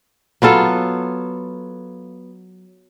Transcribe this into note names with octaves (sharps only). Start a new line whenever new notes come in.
F#3 B3 F4 A4